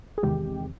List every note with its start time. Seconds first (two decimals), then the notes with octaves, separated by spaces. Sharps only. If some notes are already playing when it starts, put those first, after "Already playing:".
0.18 G#4
0.23 E2 C3 D#3 G#3 G4